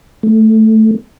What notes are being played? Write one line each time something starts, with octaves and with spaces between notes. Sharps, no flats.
A3